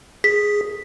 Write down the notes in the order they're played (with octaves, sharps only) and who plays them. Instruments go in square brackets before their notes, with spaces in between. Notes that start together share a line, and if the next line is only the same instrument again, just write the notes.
[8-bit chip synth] G#4 [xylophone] B6